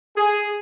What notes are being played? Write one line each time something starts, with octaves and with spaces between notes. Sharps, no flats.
G#4